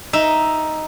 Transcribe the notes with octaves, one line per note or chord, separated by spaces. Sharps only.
D#4 E5